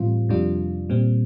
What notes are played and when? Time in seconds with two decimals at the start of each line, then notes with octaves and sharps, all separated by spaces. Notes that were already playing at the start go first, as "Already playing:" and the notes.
Already playing: A2 E3 G3 C4 F4
0.29 F2 C3 G3 D4 F4
0.90 A#2 G3 C4